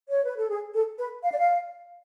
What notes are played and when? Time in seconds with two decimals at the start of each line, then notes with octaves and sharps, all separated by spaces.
0.10 C#5
0.24 B4
0.37 A4
0.50 G#4
0.75 A4
0.98 B4
1.23 F5
1.31 D5
1.38 F5